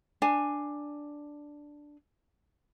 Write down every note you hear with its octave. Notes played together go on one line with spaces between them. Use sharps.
D4 G#5